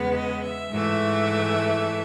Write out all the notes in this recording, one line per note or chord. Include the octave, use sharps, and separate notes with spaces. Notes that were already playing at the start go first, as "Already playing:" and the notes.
Already playing: E2 C#3 G#3 B3
D#5
E5
G#2 E3 A3